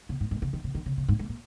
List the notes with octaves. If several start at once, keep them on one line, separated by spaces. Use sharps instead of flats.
C#3
G#2
G#2
C#3
D#3
C#3
D#3
C#3
C#3
G#2
G#2
A#2